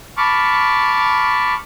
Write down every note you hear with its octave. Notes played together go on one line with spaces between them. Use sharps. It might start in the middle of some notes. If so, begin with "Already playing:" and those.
A5 B5 C#6 D6 F6